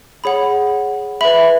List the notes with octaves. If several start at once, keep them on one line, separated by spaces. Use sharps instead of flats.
G#4 C#5 F#5 B5
B4 E5 B5